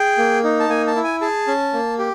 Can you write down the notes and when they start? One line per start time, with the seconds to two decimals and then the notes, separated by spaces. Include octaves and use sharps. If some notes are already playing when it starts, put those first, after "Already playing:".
Already playing: G#4 G5
0.18 A#3
0.44 D#4
0.60 A5
0.69 A#3 G#5
0.87 A5
0.96 E4
1.04 G#5
1.21 G#4 A5
1.47 C#4
1.73 A#3
1.99 G4